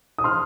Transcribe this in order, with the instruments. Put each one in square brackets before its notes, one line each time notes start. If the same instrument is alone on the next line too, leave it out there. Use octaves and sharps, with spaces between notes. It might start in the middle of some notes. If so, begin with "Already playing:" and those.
[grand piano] D#6
C6 F6